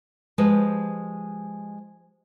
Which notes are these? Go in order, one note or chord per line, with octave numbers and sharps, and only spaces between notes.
F3 G#3 G4 B4 C5